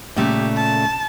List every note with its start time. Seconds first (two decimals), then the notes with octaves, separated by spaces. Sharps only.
0.16 A#2 C#3 A3 G4
0.56 A5